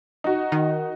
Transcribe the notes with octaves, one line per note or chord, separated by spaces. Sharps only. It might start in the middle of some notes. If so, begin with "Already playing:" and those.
D#4 F#4
D#3